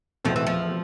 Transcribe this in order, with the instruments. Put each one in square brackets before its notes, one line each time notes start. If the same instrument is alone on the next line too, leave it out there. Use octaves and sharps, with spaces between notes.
[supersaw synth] E2 B2 A3 C4 [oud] F3
[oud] E3
F3